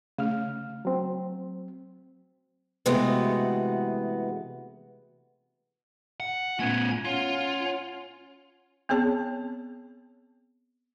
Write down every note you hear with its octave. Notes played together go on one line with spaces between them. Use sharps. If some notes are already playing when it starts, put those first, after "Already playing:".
C#3 A3 F6
F#3 C4
C3 E3 G#3 A3 B3 F#4
F#5
A#2 A3 B3 C#4 G#6
C#4 F4 C#5 F#5
B3 C4 G#4 C#5 A5